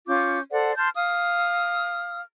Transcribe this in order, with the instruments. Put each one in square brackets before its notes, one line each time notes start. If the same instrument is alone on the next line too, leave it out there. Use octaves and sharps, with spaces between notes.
[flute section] C#4 F4 D6 G6
A4 C5 D5 F#5
A5 C6 F6 G6
F5 D#6 F6